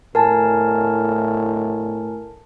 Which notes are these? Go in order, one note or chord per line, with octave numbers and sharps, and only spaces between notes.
A2 A#4 G#5 A5